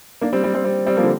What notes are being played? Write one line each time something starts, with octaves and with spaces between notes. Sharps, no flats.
A#3 D4
G3 C4
G3 C4
G3 C4
G3 C4
G3 C4
F3 A#3
D3